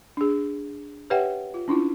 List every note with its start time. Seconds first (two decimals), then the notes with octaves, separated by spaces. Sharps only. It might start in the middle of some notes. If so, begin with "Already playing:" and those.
0.17 D4 G#4
1.10 G4 B4 C#5 E5 F#5 G5
1.54 F4
1.68 C#4 D4 E4 F4